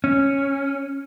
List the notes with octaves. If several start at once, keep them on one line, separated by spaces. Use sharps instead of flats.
C#4